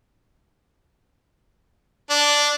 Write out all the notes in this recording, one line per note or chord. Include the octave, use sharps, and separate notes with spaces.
D4